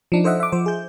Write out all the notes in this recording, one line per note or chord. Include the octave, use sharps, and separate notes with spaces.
F3 D4 D#4
A4 C5 D#5 E5 F#5
E5 D6
F3 C5
G#4 G6